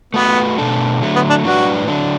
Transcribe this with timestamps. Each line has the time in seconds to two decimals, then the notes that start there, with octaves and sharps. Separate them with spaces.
0.14 A3 B3 F#4 B4
0.58 B2 A3 D4 A4
1.00 D3 F#3 A3
1.15 B3
1.29 D4
1.44 A2 F#3 D4 F#4 B4 D5
1.87 D3 F#3 D4